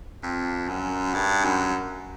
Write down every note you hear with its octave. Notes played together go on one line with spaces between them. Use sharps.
F2
F#2
G2
F#2